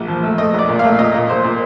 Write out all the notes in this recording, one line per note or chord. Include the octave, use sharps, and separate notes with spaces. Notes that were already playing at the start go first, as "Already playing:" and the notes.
Already playing: A#1
F3
A3
A3 D#5
A#1 D5
A#2
A3 F5
A#2 D#5
A#2
A#1 C5
A#2